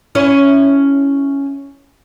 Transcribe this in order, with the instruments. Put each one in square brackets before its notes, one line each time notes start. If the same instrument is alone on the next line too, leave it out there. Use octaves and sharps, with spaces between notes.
[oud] C#4 E4 C#5